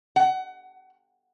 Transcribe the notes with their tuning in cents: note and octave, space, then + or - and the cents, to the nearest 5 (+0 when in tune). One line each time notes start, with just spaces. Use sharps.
F#5 +25